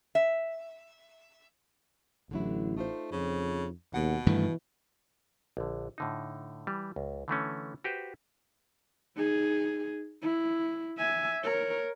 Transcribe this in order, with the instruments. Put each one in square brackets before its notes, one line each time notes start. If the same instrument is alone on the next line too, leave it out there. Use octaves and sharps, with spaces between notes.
[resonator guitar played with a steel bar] E5
[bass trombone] A1 [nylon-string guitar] D3 F#3 E4
[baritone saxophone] A3 [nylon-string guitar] D#4 F4 C5
[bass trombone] F2 [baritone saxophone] C#3
[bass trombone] D#2 [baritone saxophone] B2 [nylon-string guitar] F#5
[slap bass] G2 D#3 A3 [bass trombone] E3
[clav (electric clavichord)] A#1 D3
A2 D3 D#4
E3 G3
C#2
D3 E3 A3 C#4
F#4 G4 B4 C5
[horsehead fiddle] D#4 G#4
E4
E5 G#5
A#4 C#5